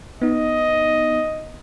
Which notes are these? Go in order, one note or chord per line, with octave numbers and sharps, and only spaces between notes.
B3 D#4 D#5